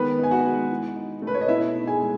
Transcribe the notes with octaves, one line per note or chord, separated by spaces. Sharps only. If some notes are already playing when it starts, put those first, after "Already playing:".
Already playing: D#3 G#3 B3 B4
D#4 G#5
F#4 F#5
G#3
E3
D#4
A3
B4
C#5
D#5
B2 E4 E5
D#4
G#4 G#5
G#3